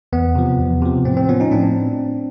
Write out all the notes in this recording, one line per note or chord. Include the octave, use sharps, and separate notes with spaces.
E2 B3
C3 F3
E2
C3 F3
A2 C4
C4
F3 B3 C#4
C#4 D#4
A2 C4 D4